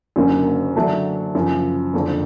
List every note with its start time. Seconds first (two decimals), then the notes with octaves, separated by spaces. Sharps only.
0.16 F#1 F#2 D3 F#3 A#3
0.76 D3 F#3 A3 D4
1.35 F#2 C#3 F3
1.93 F#1 F2 D3